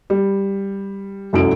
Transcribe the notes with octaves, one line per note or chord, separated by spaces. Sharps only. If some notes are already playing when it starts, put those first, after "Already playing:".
G3
F1 C2 F#2 F#3 A4 D7